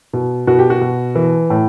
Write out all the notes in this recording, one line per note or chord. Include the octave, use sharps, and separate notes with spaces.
B2
B2 F#4
G4
F#4
B2
E3
A2